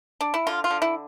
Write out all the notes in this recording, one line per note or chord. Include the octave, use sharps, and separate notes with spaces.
D4
E4
D3 F4
F4
D3
E4